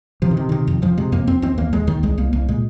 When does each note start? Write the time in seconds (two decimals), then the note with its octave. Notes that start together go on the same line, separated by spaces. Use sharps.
0.22 C3 F3
0.31 D#3
0.37 C3
0.49 C3 D#3
0.67 F2
0.82 F2 F3
0.98 C3 G#3
1.12 F2 A#3
1.27 F2 C4
1.42 D#2 C4
1.58 D#2 A#3
1.73 D#2 G#3
1.87 D#2 D#3
2.03 C2 G#3
2.18 C2 A#3
2.33 C2 A#3
2.48 A#2 G#3